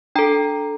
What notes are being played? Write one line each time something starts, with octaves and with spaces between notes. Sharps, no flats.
D4 A4 G5 A#5